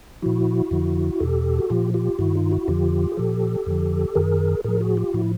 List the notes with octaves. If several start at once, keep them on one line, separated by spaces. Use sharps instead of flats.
A#2 F3 E4 F#4
F2 D3 F3
E2 B2 G4 A4
F#4
A#2 F3 F4 G4
F4 G4
G2 D#3 E4 F#4
D#4 F4
E4 F#4
F2 D3 F3 F4 G4
G#4
A#2 F3 G4 A4
F2 D3 F3
F#2 D#3 G#4 A#4
A2 F3 G#4 A#4
F#4 G#4
F4 G4
A2 F3 E4 F#4